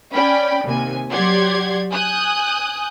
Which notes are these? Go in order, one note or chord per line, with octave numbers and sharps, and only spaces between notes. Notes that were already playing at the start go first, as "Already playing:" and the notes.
C#4 D5 G5 B5
D#2 C3 G#5
F#3 G4 D5 F#5 C6 G#6
G#5 D#6 F#6 G6